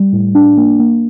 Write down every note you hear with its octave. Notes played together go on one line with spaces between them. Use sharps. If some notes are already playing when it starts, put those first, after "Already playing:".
Already playing: G3
A2
D4
A#3
A#3